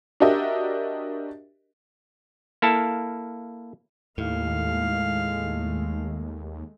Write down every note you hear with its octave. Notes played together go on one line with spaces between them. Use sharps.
D4 F#4 G4 A#4 D#5 E5
A#3 E4 A4 F5 A5
D#2 A2 G#3 A3 F5